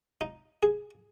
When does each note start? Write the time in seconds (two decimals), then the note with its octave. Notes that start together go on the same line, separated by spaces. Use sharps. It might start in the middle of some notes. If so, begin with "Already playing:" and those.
0.21 D#4
0.63 G#4